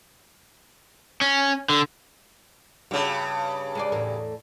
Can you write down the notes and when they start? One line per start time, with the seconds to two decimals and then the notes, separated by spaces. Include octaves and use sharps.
1.21 C#4
1.69 D3
2.91 G2 C#3 F#4
3.75 G#3 G#4 D5
3.92 E2 A2 A#4